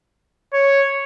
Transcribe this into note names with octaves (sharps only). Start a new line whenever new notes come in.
C#5